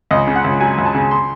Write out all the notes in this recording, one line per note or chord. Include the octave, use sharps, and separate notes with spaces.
C#2 D#5
C#3
F#5
C#2
F#3 G#5
C#2
A5
C#3
C6